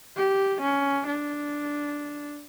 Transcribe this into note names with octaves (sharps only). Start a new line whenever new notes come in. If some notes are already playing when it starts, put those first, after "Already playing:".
G4
C#4
D4